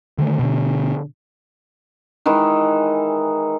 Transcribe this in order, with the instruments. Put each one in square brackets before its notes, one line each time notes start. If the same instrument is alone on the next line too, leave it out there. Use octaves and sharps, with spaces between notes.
[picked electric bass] D3 D#3 A3
B2 D3
[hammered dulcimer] D#3 E3 G#3 D#4